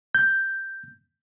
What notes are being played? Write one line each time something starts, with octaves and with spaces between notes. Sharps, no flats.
G6